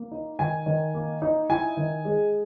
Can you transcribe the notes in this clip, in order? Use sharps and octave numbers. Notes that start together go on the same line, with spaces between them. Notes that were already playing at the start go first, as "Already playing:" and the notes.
Already playing: A#3
D#4
D#3 G#5
D#3
A#3
D#4
E4 G#5
D#3
G#3